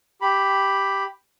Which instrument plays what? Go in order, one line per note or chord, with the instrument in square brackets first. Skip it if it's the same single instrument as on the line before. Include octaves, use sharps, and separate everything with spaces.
[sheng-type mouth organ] G4 B5